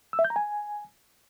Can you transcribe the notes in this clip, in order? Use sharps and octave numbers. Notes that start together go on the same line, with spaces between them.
E6
E5
G6
A#5
G#5